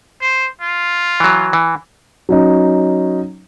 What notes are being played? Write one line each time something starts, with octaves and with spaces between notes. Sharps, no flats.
C5
F4
E3 F#3
E3
F#3 C#4 D#4